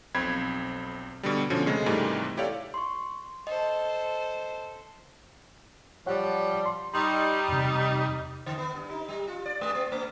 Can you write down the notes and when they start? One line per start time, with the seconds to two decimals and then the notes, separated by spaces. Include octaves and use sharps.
0.15 B1 F2 C4 B5 G#6
1.23 B2 D3 G3
1.50 B2 D3 F3 C#4
1.66 C#3 G#3 A3 C4
1.86 G#2 C3 D#3 E3 G3 A3
2.37 E4 G4 A4 C#5 D5 F5
2.74 C6 C#6
3.47 A4 C5 D#5
6.06 F3 G3 C#5 F#5
6.66 C6
6.94 G3 D#4 C6 C#6
7.48 E2 C3
8.46 D3
8.58 B3
8.75 G2
8.91 D#4
9.09 G3
9.27 F4
9.46 D5
9.61 G#3
9.75 B3
9.92 A3